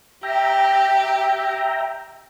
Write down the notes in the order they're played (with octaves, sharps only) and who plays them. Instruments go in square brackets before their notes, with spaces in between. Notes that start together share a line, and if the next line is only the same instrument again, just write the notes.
[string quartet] G4 [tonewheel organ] E5 G5 A#5